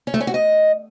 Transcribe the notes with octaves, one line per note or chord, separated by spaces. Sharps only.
C#4
A3
C#4
F#4
D#5